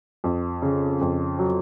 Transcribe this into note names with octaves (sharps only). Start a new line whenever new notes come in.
F2
C#3
F2
F#3